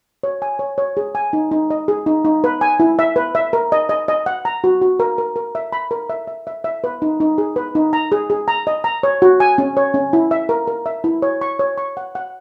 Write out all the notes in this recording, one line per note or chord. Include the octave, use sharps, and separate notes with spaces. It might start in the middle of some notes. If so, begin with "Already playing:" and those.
C#5
G#5
C#5
C#5
G#4
G#5
D#4
D#4
D#5
G#4
D#4
D#4
B4
G#5
E4
E5
B4
E5
A#4
D#5
D#5
D#5
F#5
A#5
F#4
F#4
A#4
A#4
A#4
E5
B5
A#4
E5
E5
E5
E5
B4
D#4
D#4
G#4
B4
D#4
A#5
G#4
G#4
A#5
D#5
A#5
C#5
F#4
G#5
C#4
C#5
C#4
E4
E5
A#4
A#4
E5
E4
C#5
C#6
C#5
C#6
F#5
F#5